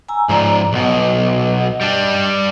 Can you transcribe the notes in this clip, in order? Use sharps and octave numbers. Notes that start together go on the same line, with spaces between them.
G#5 A#5 E6
G#2 F3 D5 A#5
B1 B2 D#5
G3 D4